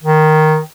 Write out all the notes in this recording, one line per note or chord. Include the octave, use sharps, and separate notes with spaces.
D#3